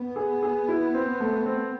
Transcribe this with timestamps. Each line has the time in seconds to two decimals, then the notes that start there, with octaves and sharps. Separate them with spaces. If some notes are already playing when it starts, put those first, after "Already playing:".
Already playing: B3
0.16 G#4
0.43 G#4
0.68 E4
0.94 C4
1.20 A3
1.46 C4